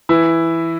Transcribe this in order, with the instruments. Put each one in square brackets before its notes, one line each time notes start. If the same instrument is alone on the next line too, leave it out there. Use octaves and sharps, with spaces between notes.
[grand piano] E3 E4